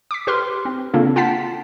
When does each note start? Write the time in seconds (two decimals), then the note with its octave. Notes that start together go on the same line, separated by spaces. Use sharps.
0.11 D6 B6
0.27 G4 B4 C6 F6
0.65 C4
0.94 C#3 A#3 C4 D4 F4 A4
1.16 F4 F#5 G5 A5 A6 B6